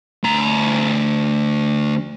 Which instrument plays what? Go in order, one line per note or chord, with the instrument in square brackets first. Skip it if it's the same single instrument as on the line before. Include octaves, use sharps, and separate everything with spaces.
[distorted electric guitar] D2 A#5